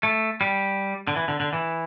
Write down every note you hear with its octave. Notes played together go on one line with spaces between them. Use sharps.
A3
G3
D3
E3
D3
D3
E3